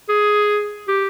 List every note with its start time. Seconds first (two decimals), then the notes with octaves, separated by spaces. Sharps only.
0.09 G#4
0.88 G4